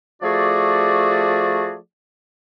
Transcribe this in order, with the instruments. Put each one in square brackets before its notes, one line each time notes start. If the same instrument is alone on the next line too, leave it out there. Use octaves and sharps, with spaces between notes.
[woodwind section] F3 A3 F#4 G#4 D5